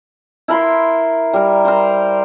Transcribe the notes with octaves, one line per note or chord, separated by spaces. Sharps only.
E4 A#4 B5 C6
G3 A#4
A#4 C5